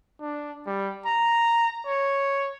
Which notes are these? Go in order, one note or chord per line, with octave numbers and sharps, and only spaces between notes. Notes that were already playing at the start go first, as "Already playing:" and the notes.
D4
G3
A#5
C#5